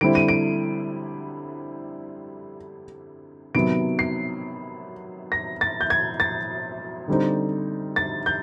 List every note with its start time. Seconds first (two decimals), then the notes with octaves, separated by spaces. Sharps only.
0.01 D3 G3 C4 E4 D7
0.15 D#7
0.28 D7
3.55 C3 D#3 F#3 B3 D7
3.99 C7
5.32 A#6
5.61 A6
5.81 G6
5.90 G#6
6.20 A6
7.08 D3 G3 C4 D#4
7.96 A6
8.26 G6